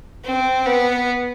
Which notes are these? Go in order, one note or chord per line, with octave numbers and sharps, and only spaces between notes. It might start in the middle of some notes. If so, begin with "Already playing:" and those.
C4
B3